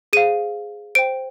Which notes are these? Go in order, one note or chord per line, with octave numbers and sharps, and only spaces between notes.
G#4 C5 F5 D#7
C5 G5 D7